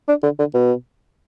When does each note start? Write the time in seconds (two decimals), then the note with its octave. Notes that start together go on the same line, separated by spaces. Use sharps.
0.08 D4
0.23 D3
0.39 D3
0.54 B2